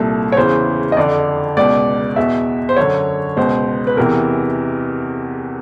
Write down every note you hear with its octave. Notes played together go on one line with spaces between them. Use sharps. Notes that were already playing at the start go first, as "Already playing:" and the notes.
Already playing: C2 A#2 A4
C#5
E2 C#3 E3 C5
D#5
F2 D3 D5
C#2 B2 D5
E2 B2 E5
C5
F#2 D3 C#5
C#2 B2 C5
B4
E2 C3 E3 A#4